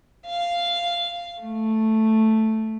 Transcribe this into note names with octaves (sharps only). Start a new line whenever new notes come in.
F5
A3